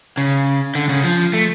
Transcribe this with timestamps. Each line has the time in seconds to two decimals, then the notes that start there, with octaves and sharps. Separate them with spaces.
0.18 C#3
0.75 D3
0.89 C#3
1.04 F3
1.33 A3